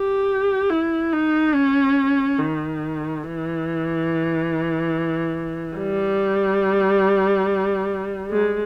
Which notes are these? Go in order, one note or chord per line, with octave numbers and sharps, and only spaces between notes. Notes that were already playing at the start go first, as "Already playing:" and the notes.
Already playing: G4
E4
D#4
C#4
D#3
E3
G3
G#3